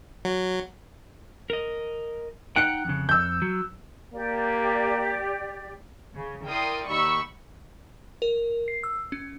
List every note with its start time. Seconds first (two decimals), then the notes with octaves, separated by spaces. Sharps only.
0.25 F#3
1.50 A#4 D#5
2.56 D#4 F#5 G5 F#6 C#7
2.85 F2 C#3
3.09 F2 E6 G6
3.42 F#3
4.14 A#3 G4 D5
6.15 C#3
6.44 E4 A#4 D5 G5 C6 D#6
6.88 D#2 D#4 B5 C#6 E6
8.22 A#4
8.68 C7
8.83 E6
9.12 C#4